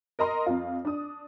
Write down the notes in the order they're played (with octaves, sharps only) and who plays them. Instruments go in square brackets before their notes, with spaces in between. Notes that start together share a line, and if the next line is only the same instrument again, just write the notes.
[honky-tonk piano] A#4 D#5 A#5 C6
F2 F4
D4 D#6